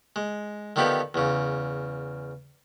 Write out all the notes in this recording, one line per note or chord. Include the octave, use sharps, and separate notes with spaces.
G#3
D3 D#3 F3 B3 G4
E2 C#3